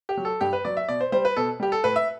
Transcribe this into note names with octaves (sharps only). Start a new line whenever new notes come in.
G4
F#3
A4
G2 G4
B4
F#3 D5
E5
B2 D5
C5
G3 C5
B4
B2 A4
G3 G4
A4
A2 B4
E5